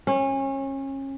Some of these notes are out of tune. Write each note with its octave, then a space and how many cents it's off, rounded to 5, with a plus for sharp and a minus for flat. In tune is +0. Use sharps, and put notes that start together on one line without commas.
C#4 -30